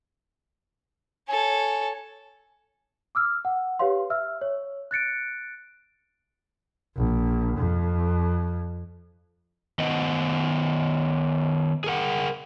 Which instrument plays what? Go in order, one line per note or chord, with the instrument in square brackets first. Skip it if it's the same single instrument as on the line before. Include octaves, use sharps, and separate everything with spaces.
[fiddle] A4 C#5 [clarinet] G#5
[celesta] D6 E6 F6
F#5
G4 B4 C#5 F5 C6
E5 E6 F6
C#5
F#6 A6 C#7 D7
[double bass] A#1
F2
[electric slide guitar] D#3 B3 D#5 F#5
G#4 A#4 F#5